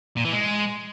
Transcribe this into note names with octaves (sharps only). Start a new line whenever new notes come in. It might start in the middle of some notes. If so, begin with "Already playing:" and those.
A#2
E3
G#3